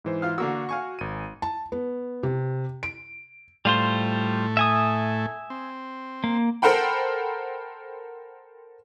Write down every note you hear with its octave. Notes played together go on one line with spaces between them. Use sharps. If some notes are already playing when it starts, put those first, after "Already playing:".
G#2 E3 C5
F4 F5 F6
D3 A#3 F#4 E6
F5 G#5 C#6
G#1 D#7
A5
B3
C3
D7
A2 G3 A3 F4 C5
E5 G#5 D#6
C4
A#3
A4 A#4 C5 F#5 G5 B5